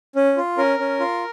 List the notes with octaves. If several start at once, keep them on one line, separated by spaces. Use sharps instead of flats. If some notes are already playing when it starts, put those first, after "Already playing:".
C#4
F4
C#4 A#4
C#4
F4